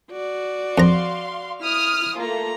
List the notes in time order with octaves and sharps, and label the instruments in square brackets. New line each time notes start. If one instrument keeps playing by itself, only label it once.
[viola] F#4 D5
[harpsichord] F2 A#5 [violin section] F5 C6
[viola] E4 [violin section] D#6 F6
[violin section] A3 A#3 F4 [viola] A4 A#5